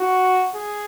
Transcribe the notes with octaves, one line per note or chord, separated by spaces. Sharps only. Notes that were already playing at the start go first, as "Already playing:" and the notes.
Already playing: F#4
G#4